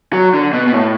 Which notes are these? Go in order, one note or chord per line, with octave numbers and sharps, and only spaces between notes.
F#3
D3
B2
B2
A2